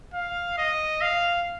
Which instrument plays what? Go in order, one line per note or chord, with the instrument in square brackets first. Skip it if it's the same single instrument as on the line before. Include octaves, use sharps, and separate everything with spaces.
[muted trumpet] F5
D#5
F5